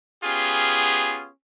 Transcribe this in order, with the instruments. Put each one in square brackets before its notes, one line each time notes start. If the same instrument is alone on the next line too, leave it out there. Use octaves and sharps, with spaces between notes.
[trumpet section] B3 C#4 F4 G4 G#4